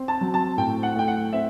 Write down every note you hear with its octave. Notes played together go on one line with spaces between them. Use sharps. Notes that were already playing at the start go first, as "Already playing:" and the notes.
Already playing: C4
A5
F#3
A5
A2 G5
F#5
A3 G5
F#5
C4 E5